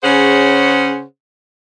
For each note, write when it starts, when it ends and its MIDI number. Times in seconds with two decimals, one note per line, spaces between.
0.03 1.02 49
0.03 1.02 61
0.03 1.02 68
0.03 1.02 72
0.03 1.02 73
0.03 1.02 78